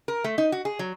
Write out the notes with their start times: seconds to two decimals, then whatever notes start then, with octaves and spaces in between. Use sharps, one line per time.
0.08 A#4
0.24 A3
0.38 D#4
0.52 F#4
0.65 G#4
0.79 F#3